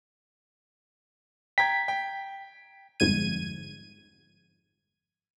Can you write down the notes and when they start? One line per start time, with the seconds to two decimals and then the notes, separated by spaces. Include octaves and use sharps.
1.58 G5 A#5 G#6 B6
1.88 G5
3.00 G1 F2 G#2 G#6 D#7